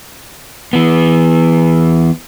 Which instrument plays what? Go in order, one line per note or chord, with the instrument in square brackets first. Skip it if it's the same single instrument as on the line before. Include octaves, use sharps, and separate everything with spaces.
[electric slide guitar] E3 B3